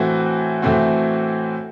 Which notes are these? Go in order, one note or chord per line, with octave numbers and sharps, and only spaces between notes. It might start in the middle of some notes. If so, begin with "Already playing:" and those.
Already playing: A2 E3 A3 C4 F#4
A2 E3 A3 C4 F#4